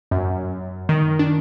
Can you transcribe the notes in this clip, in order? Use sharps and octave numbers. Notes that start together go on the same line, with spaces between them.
F#2
D#3
D4